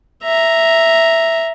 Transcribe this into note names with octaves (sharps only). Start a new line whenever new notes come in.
E5 A#5